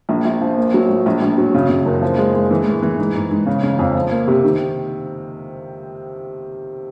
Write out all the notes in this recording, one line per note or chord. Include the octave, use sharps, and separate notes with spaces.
A#1
A#1
F3
A#3
F#3
A2
A#1
A#1
F#3
C#3
C#3
F#1
F3
G#3
G#3
E3
A2
E3
G#2
G#2
G#2
C#3
C#3
F2
F3
A#3
C3
D#3